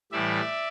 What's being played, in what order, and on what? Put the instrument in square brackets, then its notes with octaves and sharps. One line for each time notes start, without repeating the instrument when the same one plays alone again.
[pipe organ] A2 E3 G3 D5 E5